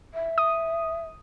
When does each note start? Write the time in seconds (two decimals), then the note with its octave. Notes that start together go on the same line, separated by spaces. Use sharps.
0.14 E5
0.38 D#6